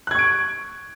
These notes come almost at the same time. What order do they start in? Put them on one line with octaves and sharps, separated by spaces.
F#6 G#6 C#6 D7